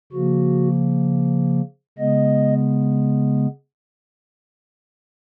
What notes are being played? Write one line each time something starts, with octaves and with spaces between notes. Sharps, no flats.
C#3 F3 A#3 F#4
C#3 G#3 B3 D#5